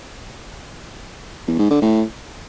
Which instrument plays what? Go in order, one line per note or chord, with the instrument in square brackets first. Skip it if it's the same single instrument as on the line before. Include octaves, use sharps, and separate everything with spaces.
[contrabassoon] E2
G#2
D3
A2